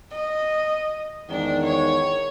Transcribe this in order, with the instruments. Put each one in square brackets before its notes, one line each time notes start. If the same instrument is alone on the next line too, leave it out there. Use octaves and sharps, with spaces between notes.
[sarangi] D#5
[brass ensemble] E2 G#2 D#3 [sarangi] D4
[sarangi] C#5